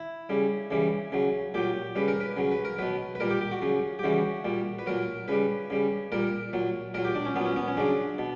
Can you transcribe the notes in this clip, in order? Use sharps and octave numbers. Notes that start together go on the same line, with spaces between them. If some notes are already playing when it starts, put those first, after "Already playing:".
Already playing: E4
C#3 G3
C#3 E3 G3
C#3 F#3
A#2 F#3 G4
C#3 G3 B4
A#4
B4
C#3 F#3
B4
A#4
B2 F#3 B4
B4
A#2 G3 A#4
G4
G4
F#4
C#3 F#3
G4
C#3 E3 G3 F#4
A#2 G3
B4
A#2 F#3 A#4
C#3 G3 B4
C#3 G3
A#2 G3 A#4
A#2 F#3
A#2 F#3 A#4
G4
D4
C#4
A#2 F#3 B3
C#4
B3
C#4
C#3 F#3 D4
B2